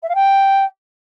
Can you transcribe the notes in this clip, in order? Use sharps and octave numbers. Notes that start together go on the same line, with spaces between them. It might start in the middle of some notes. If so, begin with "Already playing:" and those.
E5
F5
G5